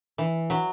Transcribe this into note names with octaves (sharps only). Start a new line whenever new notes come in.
E3
F#3